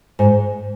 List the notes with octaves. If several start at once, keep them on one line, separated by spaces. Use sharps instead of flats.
G#2